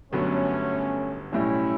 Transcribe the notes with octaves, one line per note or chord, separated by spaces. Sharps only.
G1 F#2 D3 F#3 A3 B3 C#4
B1 A2 G3 C#4 E4